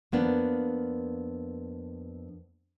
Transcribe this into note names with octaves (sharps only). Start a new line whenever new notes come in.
F2 A#3 B3 D4